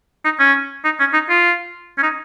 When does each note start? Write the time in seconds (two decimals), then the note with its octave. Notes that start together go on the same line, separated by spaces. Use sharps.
0.25 D#4
0.39 C#4
0.85 D#4
1.00 C#4
1.13 D#4
1.29 F4
1.98 C#4
2.03 D#4